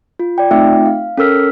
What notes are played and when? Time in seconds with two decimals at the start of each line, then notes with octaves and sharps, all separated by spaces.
0.19 F4
0.38 D5 G5
0.51 A3 C4 D#4 F4 E5 G5
0.86 F5
1.17 C#4 A4 A#4 E6 F6 B6